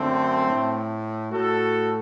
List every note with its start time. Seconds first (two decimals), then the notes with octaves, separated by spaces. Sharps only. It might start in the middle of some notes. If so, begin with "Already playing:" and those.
Already playing: F#2 D3 A3 C4
0.49 A2
1.31 A2 F#4 A4